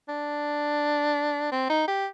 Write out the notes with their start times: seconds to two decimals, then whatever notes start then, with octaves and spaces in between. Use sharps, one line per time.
0.08 D4
1.52 C4
1.70 D#4
1.88 G4